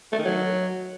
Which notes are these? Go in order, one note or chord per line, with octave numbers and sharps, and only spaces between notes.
A3
D#3
F#3